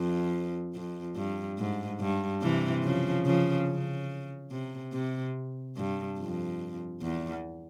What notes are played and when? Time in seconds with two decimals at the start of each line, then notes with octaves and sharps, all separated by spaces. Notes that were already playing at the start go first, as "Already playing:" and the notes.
Already playing: F2
0.75 F2
1.16 G2
1.58 G#2
2.00 G2
2.42 C3 E3
2.83 C#3 F3
3.25 C#3 F3
3.68 C#3
4.51 C3
4.93 C3
5.76 G2
6.18 F2
7.02 E2